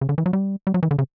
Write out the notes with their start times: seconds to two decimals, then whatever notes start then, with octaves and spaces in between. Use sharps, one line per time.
0.01 C#3
0.09 D3
0.18 E3
0.26 F#3
0.33 G3
0.67 G3
0.74 F#3
0.83 E3
0.91 D3
0.99 C#3